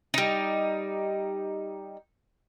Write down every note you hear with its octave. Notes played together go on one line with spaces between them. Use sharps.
G3 D#4